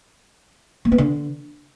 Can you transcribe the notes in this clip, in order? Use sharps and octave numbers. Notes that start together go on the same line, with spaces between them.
A#3
B3
D3